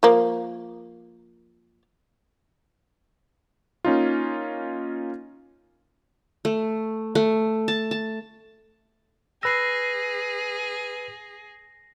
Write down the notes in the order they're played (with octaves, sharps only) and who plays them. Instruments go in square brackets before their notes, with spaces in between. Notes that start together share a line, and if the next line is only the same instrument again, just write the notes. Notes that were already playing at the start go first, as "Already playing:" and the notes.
[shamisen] F3 A#3
[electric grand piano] A#3 C#4 D#4 F4
[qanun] A3
A3
A5
A5
[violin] G#4 [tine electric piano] B4 E6 [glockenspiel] A#6 C7